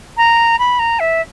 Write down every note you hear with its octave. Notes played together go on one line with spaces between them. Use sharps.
A#5
B5
A#5
E5